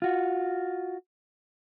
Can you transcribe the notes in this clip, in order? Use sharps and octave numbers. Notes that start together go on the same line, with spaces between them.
F4 F#4